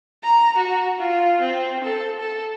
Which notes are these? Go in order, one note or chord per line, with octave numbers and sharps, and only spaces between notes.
A#5
F#4
F4
C4
A4
A4